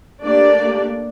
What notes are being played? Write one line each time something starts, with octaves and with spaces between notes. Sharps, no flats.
A3 A#3 D4 G4 D5